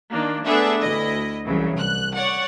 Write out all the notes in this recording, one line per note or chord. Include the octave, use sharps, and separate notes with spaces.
D#3 A#3 D4
A3 B3 D4 G#4 A4 E5
D2 E4 D#5
C2 C#3 E3 F#3
C2 F#6
C#5 D5 F#5